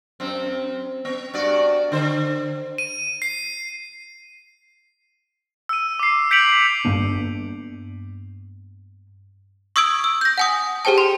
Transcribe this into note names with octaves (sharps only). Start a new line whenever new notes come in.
F#2 C4
B3
G2 F#4 D5
D3 C5
D#7
C7
E6 D#7
D6 C7
G6 B6 C#7 D7 F7 F#7
G2 A#3 B3 D4
C#6 D#6 E6 G#6 D7 F#7
E6
G6 A#6
F#5 G#5 D#6
G4 G#4 C5 G5 A5
C6